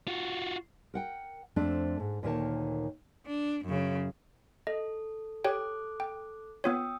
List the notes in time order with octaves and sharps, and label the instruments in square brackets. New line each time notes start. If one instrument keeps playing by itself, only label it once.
[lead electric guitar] F4 F#4
[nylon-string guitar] A#4 F#5 G5
F2 A3 C4 D4
G#2
D2 A#2 D#3 A#4 C#5 A5
[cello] D4
F#2 C#3
[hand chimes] A4 [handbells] D#5
[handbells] G4 C#5 G5 [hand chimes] A4 D6 F#6
[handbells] G5
[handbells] B3 F4 C#5 [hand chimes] G5 D#6 E6